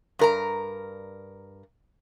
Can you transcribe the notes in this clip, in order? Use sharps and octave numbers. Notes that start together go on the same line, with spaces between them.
G2 A#4 A#5